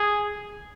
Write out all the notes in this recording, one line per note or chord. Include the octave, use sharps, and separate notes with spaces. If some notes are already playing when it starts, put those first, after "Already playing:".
Already playing: G#4